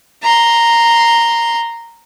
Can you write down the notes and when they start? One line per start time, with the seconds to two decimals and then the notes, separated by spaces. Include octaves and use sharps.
0.22 A#5 C6